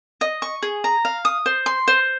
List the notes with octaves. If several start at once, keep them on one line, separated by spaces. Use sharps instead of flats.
D#5
C#6
G#4
A#5
F5
D#6
C5
C6
C5